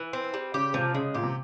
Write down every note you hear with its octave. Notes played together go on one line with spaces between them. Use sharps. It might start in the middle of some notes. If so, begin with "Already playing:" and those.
Already playing: E3
C4
G3
C#3 G4
C3 F3
C#3 G#3
A#2 G4
C3